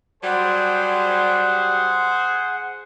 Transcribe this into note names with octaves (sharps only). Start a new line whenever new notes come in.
F#3 G3 G#4 C5 F#5